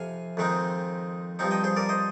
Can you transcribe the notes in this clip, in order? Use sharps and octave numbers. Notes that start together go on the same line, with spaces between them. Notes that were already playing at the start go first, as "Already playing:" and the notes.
Already playing: F2 C3 F5 G#5
F2 D#3 G#3 C4 D#4
G2 F3 C4 D#4
D#5 G5
G#4 C5
A#4 D5
C5 D#5